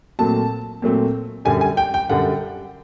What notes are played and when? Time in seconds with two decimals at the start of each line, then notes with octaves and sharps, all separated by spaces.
0.19 A#2 F#3 A3 C4 A5
0.82 A#2 F#3 A3 C4
1.45 F#2 D3 G3 G#5
1.61 G#5
1.77 G5
1.94 G5
2.09 F#2 D3 G3 F#5